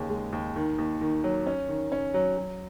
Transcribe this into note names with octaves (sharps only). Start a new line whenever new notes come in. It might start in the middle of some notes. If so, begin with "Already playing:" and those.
Already playing: D#2 C#3
G#3
D#2
D#3
D#2
D#3
F#3
C#4
D#3
C#4
F#3
F#3